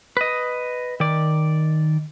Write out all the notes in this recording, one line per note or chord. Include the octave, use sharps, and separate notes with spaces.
B4 D#5
D#3 D5